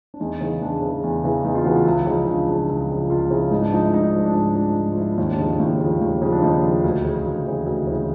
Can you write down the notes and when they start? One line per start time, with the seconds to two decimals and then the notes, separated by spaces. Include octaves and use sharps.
0.14 D4
0.20 E2 D#4
0.41 C#3 E3 D#4
0.62 E2 D4
0.82 C#3 E3
1.04 E2
1.24 C#3 E3
1.44 E2 D#4
1.55 F4
1.65 C#3 E3 F#4
1.76 F4
1.85 C#2 E4
2.06 C#3 F3 D#4
2.27 C#2 D4
2.48 C#3 F3 D4
2.69 C#2
2.90 C#3 F3
3.10 C#2 F4
3.31 C#3 F3 E4
3.51 G#2 D#4
3.62 D4
3.72 F3 D#4
3.82 E4
3.93 G#2 D#4
4.14 F3
4.25 D4
4.34 G#2 D#4
4.55 F3 D4
4.76 G#2
4.93 F4
4.97 F3 E4
5.18 D#2 D#4
5.31 D4
5.39 C#3 F3 D#4
5.60 D#2 E4
5.80 C#3 F3
6.01 D#2
6.22 C#3 F3
6.32 D4
6.42 D#2 D#4
6.64 C#3 F3
6.84 D2
7.04 C#3 E3
7.26 D2
7.45 C#3 E3
7.66 D2
7.87 C#3 E3